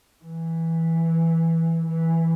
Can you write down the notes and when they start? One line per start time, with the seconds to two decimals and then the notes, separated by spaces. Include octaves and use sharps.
0.25 E3
1.87 E3